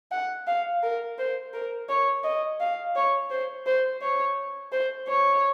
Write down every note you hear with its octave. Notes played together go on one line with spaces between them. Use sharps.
F#5
F5
A#4
C5
A#4
C#5
D#5
F5
C#5
C5
C5
C#5
C5
C#5